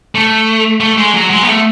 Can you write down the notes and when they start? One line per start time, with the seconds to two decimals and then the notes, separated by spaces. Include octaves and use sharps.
0.15 A3
0.81 A3
0.98 G#3
1.15 F#3
1.31 G#3
1.43 B3
1.47 A3